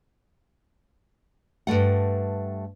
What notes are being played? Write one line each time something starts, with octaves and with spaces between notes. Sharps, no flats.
G2 D#3 A3 F#5